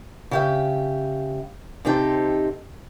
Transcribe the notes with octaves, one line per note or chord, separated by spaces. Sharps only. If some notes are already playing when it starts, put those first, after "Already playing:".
C#3 G4 E5
C3 C4 D#4 G4 A4